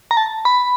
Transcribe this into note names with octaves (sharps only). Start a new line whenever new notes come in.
A#5
A5
B5